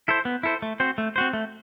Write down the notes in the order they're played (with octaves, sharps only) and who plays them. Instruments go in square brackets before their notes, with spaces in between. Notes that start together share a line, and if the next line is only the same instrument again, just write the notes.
[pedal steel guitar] E4 A4 C5
B3
E4 A4 C5
A3
C4 F#4 C5
A3
C4 F#4 C5
A3